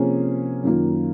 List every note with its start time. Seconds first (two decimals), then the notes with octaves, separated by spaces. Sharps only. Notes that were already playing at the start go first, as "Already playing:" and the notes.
Already playing: C3 F3 A#3 C#4 G#4
0.63 F#2 D#3 A#3 F4